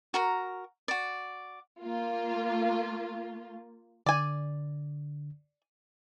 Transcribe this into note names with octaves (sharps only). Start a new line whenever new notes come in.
F#4 A#4 A#5
F#4 D5
A#3 F4
D3 D5 G#5